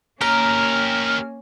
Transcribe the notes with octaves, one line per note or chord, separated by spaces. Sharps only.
A#3 C#4 G4 A#4 A#5 F6